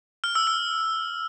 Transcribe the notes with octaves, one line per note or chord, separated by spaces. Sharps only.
F6
E6
E6